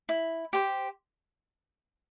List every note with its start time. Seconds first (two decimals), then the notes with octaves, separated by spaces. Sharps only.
0.09 E4
0.53 G4 C5